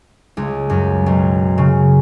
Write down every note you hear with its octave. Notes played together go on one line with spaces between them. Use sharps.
C#2
F#2
B1
C#3